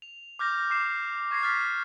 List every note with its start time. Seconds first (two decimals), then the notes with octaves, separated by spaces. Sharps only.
0.02 F7
0.39 D6 F6 G6 A#6
0.70 D6 C7 E7
1.31 C#6 G#6 A#6 C7
1.43 F6 A6 B6